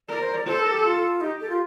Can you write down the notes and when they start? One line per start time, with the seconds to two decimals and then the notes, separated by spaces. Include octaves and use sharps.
0.09 A#4 D5
0.21 C5
0.34 D5
0.47 A4 C5
0.60 A#4
0.71 G4
0.84 F4
1.21 D#4 G4
1.41 A4
1.50 F4